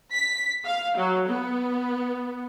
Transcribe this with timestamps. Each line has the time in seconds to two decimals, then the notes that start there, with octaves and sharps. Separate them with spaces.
0.12 B6
0.65 F5
0.97 F#3
1.28 B3